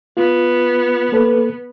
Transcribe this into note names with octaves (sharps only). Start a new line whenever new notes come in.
B3 F4
A#3 A4 B4